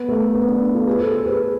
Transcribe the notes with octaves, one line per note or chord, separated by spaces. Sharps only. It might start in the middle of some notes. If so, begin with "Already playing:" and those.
Already playing: B3
A3
B3
B3 D4
F4 A4
G#4 B4
A4 C5
A4 C5
G#4 B4